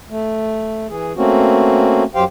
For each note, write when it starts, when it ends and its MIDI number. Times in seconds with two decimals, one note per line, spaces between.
0.10 0.87 57
0.89 1.12 52
0.89 1.12 68
1.17 2.04 57
1.17 2.04 58
1.17 2.04 60
1.17 2.04 61
1.17 2.04 66
2.15 2.24 42
2.15 2.24 54
2.15 2.24 67
2.15 2.24 72
2.15 2.24 77
2.15 2.24 79